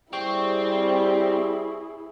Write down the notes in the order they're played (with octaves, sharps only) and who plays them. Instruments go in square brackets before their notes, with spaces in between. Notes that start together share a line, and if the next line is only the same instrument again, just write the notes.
[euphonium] G3 [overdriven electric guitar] C4 [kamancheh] E4 G#4 [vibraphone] C#6